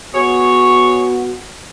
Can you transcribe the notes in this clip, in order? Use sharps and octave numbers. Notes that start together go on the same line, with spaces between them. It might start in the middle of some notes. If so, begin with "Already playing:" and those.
B3 F#4 G#4 C#5